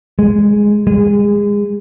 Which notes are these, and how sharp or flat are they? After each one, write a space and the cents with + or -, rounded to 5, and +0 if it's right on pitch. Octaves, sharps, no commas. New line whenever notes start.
G#3 -5
G#3 -25